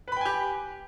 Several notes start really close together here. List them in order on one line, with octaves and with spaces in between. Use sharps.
B4 B5 G5 G#5 G4